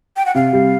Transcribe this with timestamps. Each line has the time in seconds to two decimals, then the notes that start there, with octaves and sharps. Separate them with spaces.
0.17 G5
0.26 F#5
0.35 C3 F5
0.53 G3